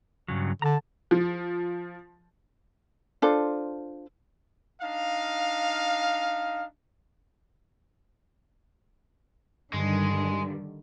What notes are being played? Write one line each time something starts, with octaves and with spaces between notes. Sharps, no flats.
G2 C#3 F#3
D3 A5 A#5
F3
D4 F4 A4 C5
D4 D#4 F5
G2 D3 D#3 G3 G#3